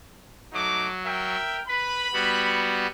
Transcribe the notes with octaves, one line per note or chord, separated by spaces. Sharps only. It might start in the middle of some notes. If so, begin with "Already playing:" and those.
F#3 A3 D#4 D6
A#4 E5 G5
B4 B5
G3 B3 F#4